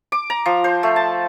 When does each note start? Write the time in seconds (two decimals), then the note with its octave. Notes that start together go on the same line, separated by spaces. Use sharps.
0.12 D6
0.30 A#5
0.46 F3
0.64 C5
0.83 A3
0.96 A5